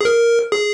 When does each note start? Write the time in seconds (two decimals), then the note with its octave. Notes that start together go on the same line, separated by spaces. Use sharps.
0.01 G#4
0.05 A#4
0.52 G#4